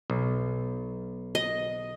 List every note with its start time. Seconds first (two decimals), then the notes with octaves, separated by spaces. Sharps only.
0.10 B1
1.35 D#5